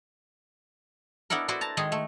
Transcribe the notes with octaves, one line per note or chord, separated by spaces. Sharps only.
B3 D4 E4 A4 A#4
E4 F#4 B4 C5 D5
A5 A#5
D#3 G#3 D#4 G#4
A3